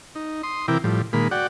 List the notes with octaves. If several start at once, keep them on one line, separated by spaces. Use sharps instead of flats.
D#4
C6 D#6
C3 E3 E4 A#4 G5 D6
A2 F3 G3
A#2 D#3 G#3 A#3 B5
F#4 D5 F#5 G5